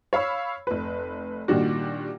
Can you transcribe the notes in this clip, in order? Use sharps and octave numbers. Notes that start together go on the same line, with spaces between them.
C#5 F5 B5 E6
F1 B4
A#2 D#3 G3 D4 F#4